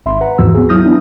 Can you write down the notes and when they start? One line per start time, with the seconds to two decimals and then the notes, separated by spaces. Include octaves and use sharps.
0.06 G#1 E5 B5 C6
0.21 B4 F#5 A#5
0.38 D#2 G#2 E3 F3 F#4 E6
0.55 B3 F#4 G#4
0.69 F#3 E4 D#6 F6 G6 A#6
0.84 B3 D4 E4